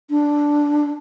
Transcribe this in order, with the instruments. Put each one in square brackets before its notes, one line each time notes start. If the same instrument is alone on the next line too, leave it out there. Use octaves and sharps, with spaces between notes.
[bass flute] D4